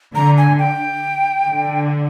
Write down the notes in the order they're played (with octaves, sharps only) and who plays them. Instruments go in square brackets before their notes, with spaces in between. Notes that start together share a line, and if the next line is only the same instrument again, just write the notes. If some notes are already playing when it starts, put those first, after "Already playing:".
[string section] D3 [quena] A#5
[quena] G#5
G5
[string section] D3